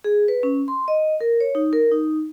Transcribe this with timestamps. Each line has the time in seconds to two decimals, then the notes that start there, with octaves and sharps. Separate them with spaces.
0.04 G#4
0.28 B4
0.43 C#4
0.68 C6
0.88 D#5
1.21 A#4
1.40 C#5
1.55 D#4
1.73 A#4
1.92 D#4